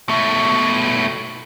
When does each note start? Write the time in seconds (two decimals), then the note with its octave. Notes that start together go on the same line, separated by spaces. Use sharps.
0.09 B2 A3